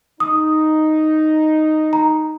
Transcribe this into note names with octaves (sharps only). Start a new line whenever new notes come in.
D#4 D#6
A#5